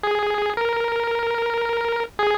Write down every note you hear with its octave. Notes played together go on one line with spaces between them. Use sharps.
G#4
A#4
G#4